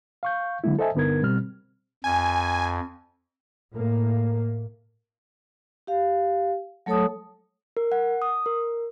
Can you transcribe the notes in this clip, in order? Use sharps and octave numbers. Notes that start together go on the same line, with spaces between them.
F5 C#6 G6
D3 F#3 G#3 A#3 E4
A4 C5 D#5 E5 G#5 A5
G2 D3 B3 D#4 A#4 G#6
B2 G3 C4 F6
F2 G#5
A2 A#3
G4 F5
F#3 A3 A4 C#5 A5 D#6
A#4
F#5
D#6
A#4